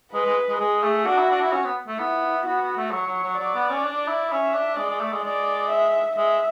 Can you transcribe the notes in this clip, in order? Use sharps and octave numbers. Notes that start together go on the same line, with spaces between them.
G#3 B4
G#3
G#3
G#3 G#4
A3
D4 F#4
E4
D4
E4
C#4
B3
A3
B3 E4
B3 F#4
B3
A3
F#3 C#5
F#3
F#3
F#3 D5
B3
C#4
D4
E4
C#4 E5
D4
G#3 D5
G#3
A3
G#3
G#3 D5
E5
G#3 E5